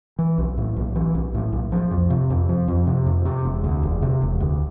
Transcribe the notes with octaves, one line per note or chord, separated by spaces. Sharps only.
E3
B1
A2
B1
E3
B1
A2
B1
F3
F2
C3
F2
F3
F2
C3
F2
C3
E1
D2
E1
C3
E1
D2